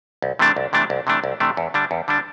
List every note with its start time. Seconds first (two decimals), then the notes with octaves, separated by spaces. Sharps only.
0.22 C2
0.39 C3 E3 A3 D4
0.56 C2
0.73 C3 E3 A3 D4
0.90 C2
1.07 C3 E3 A3 D4
1.24 C2
1.40 C3 E3 A3 D4
1.57 E2
1.74 D3 G3 D4
1.91 E2
2.08 D3 G3 D4